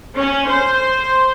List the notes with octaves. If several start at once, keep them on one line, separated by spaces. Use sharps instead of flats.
C#4
C5